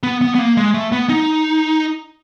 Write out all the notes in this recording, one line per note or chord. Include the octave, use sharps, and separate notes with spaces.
B3
B3
B3
A#3
G#3
A3
B3
D#4